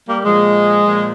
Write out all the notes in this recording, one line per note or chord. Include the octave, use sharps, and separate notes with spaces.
G3 A#3
A#2 F3 G#3
A#2 F3